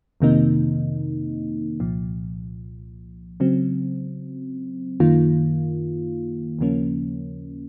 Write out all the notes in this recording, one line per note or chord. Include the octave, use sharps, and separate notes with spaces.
F2 C3 D#3 A#3 D#4
C2 A#2 F3
C#3 F#3 C4
F#2 D#3 A#3 F4
D#2 C#3 F3 A#3 C#4